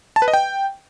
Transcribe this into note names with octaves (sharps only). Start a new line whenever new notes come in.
A5
B4
D#5
G5